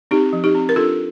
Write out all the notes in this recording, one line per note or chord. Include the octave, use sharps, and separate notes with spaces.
C4 D#4 G4
F3
D#4 G4
C4
A#4
D4 F4 A4